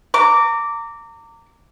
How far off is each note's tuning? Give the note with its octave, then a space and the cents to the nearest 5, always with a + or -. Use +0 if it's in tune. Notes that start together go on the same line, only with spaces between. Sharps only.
A#5 -30 D6 -10